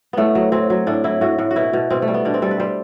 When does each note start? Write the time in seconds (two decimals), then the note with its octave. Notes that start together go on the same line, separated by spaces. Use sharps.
0.13 A2 A3 B3
0.35 F#3
0.52 F#3 C4
0.70 F#3
0.87 A2 D4
1.04 F#3 E4
1.21 A2 F#4
1.38 A2
1.51 F#4
1.56 B2 E4
1.73 B2
1.90 B2 C4
2.02 A3
2.08 G3
2.14 B3
2.25 B2 D4
2.34 C4
2.42 G3 A4
2.51 B4
2.60 G3 C5